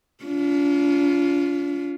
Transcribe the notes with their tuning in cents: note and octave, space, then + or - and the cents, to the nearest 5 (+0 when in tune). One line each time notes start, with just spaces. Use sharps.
D4 -45 F4 +0